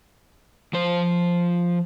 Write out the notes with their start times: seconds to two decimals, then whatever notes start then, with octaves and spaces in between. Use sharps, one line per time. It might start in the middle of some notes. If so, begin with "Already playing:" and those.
0.73 F3 C5